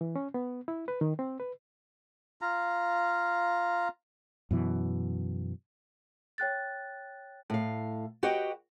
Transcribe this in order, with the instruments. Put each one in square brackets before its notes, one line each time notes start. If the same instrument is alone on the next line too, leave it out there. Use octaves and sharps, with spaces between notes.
[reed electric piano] E3
C#4
B3
E4
B4
D#3
C4
B4
[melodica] F4 F5 A#5
[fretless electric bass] F#2 B2 E3
[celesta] C#5 G5 F#6 A6
[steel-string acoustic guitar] A2 F5
F#4 G4 B4 D#5 F#5 G5